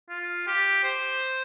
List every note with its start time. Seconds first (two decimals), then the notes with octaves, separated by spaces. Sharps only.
0.10 F4
0.47 G4
0.84 C5